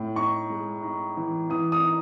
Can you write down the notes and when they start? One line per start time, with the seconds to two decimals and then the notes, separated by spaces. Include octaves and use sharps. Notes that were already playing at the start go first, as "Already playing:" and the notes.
Already playing: A2
0.16 D#4 C#6
0.50 G#3
0.83 D#4
1.17 E3
1.50 E3 D#6
1.72 D#6
1.83 D#4